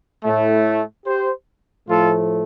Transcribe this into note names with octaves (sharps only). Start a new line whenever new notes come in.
A2 A3
G4 C5
A2 F3 A3 F4 A4